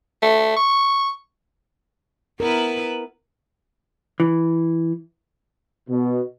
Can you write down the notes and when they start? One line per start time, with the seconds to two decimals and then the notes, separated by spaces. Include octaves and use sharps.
0.22 A3
0.56 C#6
2.40 B3 E4 A#4 B4
4.20 E3
5.90 B2